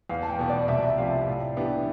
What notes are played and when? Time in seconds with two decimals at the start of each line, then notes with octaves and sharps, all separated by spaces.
0.09 E2 F5
0.23 A5
0.30 G5
0.39 B2 B3
0.49 D5
0.68 C2 E5
0.88 E5
0.98 C3 F3 F5
1.28 A2
1.57 E3 B3 D4 G4